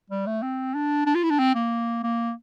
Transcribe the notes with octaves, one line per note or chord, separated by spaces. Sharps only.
G3
A3
C4
D4
D4
F4
E4
D4
C4
A#3
A#3